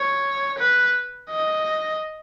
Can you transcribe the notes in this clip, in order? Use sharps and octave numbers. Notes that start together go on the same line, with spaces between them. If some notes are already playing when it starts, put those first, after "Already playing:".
Already playing: C#5
B4
D#5